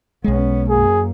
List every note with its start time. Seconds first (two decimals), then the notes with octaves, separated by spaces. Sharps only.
0.24 B1 G#3 B3 C#4
0.68 F#2 A#3 G#4